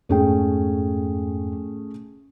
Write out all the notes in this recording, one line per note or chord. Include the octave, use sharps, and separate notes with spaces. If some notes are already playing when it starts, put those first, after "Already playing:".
F2 G#2 A3 C#4 G#4 G5